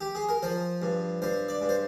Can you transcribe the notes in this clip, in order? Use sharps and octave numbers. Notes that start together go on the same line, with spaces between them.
G4
G#4
A#4
F3 C5
G2
G2 C5
D5
G2
C5